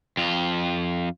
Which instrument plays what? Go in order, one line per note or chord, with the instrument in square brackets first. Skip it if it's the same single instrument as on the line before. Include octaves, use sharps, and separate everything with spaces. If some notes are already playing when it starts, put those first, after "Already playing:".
[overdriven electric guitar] F2 F4